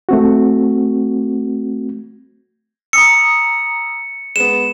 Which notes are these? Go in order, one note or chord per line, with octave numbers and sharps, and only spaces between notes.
A3 C4 F#4
A#5 D#6 E6 C#7
G#3 B3 E7